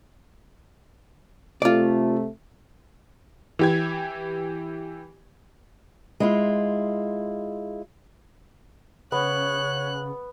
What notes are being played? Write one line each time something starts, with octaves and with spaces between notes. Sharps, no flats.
C3 A3 F4 D5
E3 G4 G#6
G#3 E4 F4
C#3 B3 C#5 F#6